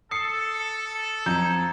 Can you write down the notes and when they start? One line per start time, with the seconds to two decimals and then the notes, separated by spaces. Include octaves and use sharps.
0.11 A4 D#6 C7 C#7
1.26 F2 A#5 G6 G#6